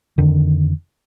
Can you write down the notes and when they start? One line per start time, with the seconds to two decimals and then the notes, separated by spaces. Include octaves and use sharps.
0.18 F2 D3 D#3